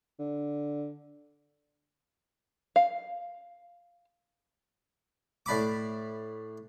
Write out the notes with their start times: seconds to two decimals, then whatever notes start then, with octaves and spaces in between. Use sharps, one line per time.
0.19 D3
2.76 F5
5.46 A2 D4 B5 D6